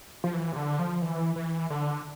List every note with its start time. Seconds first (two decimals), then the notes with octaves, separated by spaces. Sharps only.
0.24 F3
0.34 E3
0.52 C3
0.56 D3
0.79 F3
1.02 E3
1.36 E3
1.70 D3